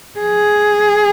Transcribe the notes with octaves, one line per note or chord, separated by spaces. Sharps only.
G#4